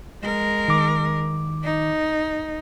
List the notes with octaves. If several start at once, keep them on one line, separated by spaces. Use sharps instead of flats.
G#3 A#4
D#3 D6
D#4